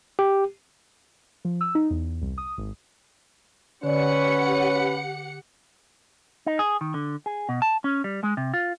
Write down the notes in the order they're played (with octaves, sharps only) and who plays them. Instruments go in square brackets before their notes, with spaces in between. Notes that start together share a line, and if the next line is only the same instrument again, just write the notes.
[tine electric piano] G4
[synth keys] F3
E6
D#4
E2
C2
D#6
G#1
[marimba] D3 D5 [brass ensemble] C#4 B4 [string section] G4 F#5 C#7 [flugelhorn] C#5
[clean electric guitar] D#4
G#4
D#3
D3
G#4
B2
A5
C#4
G3
G#3
C3
F4